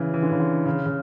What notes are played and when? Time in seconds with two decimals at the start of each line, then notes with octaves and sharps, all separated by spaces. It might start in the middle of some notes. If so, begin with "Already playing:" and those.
Already playing: C#3 E3
0.14 E3
0.23 D3
0.32 C#3
0.40 D3
0.66 C#3
0.86 C#3